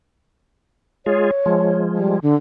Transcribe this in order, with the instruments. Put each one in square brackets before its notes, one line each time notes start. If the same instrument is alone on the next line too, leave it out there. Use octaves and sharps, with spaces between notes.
[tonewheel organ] G#3 F4 G#4 [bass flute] C#5
[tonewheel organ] F3 G#3
[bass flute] G3
D3